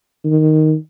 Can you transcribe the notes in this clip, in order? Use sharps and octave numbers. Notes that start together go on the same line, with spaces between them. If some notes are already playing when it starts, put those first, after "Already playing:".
D#3